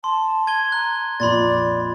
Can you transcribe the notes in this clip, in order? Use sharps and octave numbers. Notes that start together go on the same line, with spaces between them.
A5 C6
G#6 D#7 G7
A#5 F#6
A#1 F2 D5 B5 C6 A6